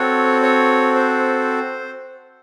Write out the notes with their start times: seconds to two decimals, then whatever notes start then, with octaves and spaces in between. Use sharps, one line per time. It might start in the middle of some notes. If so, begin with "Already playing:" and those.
Already playing: C4 F#4 A4 C#5
0.43 C#5
0.95 C5